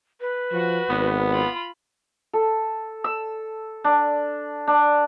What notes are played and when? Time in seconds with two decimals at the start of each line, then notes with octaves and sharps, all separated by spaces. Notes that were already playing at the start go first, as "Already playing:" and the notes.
0.21 B4
0.52 F3 F#4
0.89 G#1 B3
1.31 F4 B5
2.33 A4
3.04 E6
3.84 D4
4.67 D4